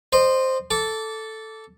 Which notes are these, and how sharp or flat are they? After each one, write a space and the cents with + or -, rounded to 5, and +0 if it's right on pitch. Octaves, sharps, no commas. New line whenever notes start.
C5 +0 D#5 -30
A4 +0 D6 -20